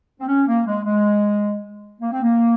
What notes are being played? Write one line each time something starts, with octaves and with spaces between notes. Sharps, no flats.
C4
C#4
A#3
G#3
G#3
A#3
C4
A#3